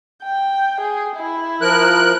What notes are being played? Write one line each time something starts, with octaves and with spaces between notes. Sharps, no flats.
G5
G#4
E4
F3 A#4 F#6